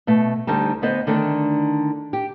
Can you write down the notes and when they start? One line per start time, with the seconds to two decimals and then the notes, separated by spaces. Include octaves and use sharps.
0.07 B2 A3
0.47 D2 D3 G3 D#4 A5
0.82 D2 B3 C5 D#5
1.07 D3 D#3 A3 D4
2.13 G4